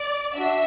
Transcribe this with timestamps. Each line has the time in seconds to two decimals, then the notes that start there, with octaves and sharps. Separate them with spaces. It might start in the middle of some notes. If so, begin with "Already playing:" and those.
Already playing: D5
0.35 D4 F#4 E5